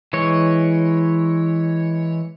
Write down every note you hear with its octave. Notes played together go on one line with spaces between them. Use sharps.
E3 G#3 C#5